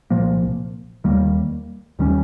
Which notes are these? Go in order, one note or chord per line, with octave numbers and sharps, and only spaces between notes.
C2 A#2 F3 A#3
D#2 D#3 G3 A#3
D#2 D#3 G3 C#4